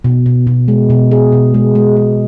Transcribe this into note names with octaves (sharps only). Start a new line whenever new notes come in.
B2
B2
B2
G#3
B2
G#4
B2
G#3
G#3
G#3